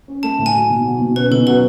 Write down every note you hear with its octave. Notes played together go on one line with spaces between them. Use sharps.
C#4
A3 A5
A2
G#5
F#3
B2
F#3
B2
C#4 B4
B2 A4
F#3 B4